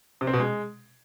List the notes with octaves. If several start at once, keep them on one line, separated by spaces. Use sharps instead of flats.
C3
C4
B2
G#3